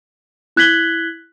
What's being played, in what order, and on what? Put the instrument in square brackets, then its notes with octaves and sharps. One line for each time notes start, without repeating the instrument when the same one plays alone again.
[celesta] E4 F#6 G#6 B6 F#7 G7